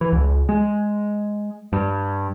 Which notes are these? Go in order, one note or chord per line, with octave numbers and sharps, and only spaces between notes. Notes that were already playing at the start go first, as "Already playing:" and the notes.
E3
C#2
G#3
G2